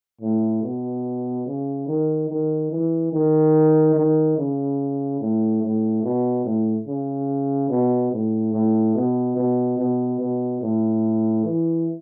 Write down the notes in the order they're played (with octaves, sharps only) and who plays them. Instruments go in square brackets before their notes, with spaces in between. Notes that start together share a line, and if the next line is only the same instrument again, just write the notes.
[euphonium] A2
B2
C#3
D#3
D#3
E3
D#3
D#3
C#3
A2
A2
B2
A2
C#3
B2
A2
A2
B2
B2
B2
B2
A2
E3